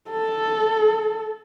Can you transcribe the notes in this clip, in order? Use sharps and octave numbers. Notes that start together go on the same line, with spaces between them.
A4